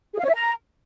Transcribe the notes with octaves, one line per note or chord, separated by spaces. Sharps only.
G#4
F5
C#5
E5
A#5